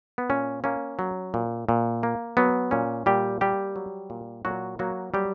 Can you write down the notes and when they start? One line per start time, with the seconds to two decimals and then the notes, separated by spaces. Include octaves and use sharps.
0.18 B3
0.29 A#2 C#4
0.64 A#3 C#4
0.99 F#3
1.34 A#2
1.69 A#2
2.03 A#3
2.37 F#3 B3
2.71 A#2 C#4
3.06 A#2 G3 G4
3.41 G3 A#3 G4
3.76 F#3
4.10 A#2
4.45 A#2 F#3 F#4
4.79 F#3 A#3 F#4
5.14 F#3 G3 G4